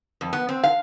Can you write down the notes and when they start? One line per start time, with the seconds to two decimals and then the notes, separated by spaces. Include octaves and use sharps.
0.21 F2
0.33 B3
0.49 C4
0.63 F5